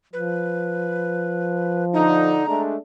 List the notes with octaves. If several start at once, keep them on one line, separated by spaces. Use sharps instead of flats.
F3 B4
D3 D#4 A#5
G#3 A3 D4